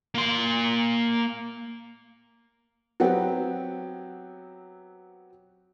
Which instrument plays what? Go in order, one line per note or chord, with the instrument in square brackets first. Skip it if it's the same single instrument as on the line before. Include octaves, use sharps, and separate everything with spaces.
[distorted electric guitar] A#3 C6
[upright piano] F#3 B3 C4 G4